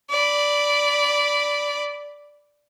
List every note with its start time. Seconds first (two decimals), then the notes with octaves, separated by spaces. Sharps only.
0.10 D5 B5